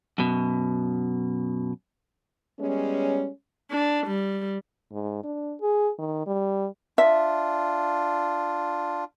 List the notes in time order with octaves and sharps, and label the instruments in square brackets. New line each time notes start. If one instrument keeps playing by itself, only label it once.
[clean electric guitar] F#2 B2
[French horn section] G3 G#3 B3 C#4
[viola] D4
G3
[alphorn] G#2
D4
G#4
D#3
G3
[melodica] D4 F4 [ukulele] E5